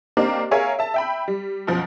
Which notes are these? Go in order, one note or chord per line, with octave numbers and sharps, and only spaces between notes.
A#3 C4 D4 D#4 G4
G#4 A#4 C#5 E5 F5 G#5
E5 A5
E5 G5 B5
G3
F#2 B2 F3